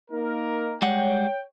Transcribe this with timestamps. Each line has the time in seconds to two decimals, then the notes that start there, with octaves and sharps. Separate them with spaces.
0.11 A#3 D#4 A#4
0.82 G3 G#3 C#5 F#5 G5